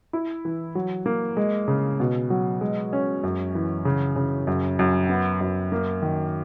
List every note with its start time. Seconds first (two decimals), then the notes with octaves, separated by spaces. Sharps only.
0.13 E4
0.45 E3
0.75 F#3
1.06 A#3
1.37 G#3
1.68 C#3
2.00 B2
2.30 F#3
2.61 G#3
2.93 C#4
3.24 F#2
3.55 E3
3.85 C#3
4.16 C#3
4.47 F#2
4.79 F#2
5.09 B3
5.41 F#2
5.72 A#3
6.02 D#3